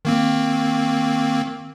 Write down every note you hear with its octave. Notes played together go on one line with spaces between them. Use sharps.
D#3 A#3 C4